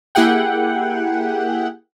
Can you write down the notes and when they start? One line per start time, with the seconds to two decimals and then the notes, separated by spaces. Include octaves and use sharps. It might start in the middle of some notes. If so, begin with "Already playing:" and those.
0.15 A#3 E4 G4 G#4 F#5 G5